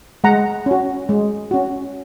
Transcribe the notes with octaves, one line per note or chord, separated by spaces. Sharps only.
G#3 F#5 A#5
C#4 F#4
G#3
C#4 F#4